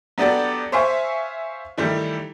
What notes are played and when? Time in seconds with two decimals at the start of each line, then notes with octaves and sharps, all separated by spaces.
0.18 F#3 B3 D4 G4 A4 D5
0.72 C5 C#5 E5 F5 G#5 C#6
1.78 D#3 E3 G3 A3 G4